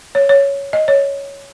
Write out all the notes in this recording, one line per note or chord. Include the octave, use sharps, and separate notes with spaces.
C#5
C#5
D#5
C#5